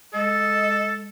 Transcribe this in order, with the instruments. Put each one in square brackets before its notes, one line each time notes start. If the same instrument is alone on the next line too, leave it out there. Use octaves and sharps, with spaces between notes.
[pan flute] G#3 [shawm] A4 [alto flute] D#5